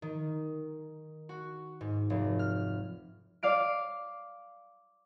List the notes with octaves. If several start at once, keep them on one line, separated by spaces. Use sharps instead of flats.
D#3
F#4
G#2
F1
F6
D5 F5 D7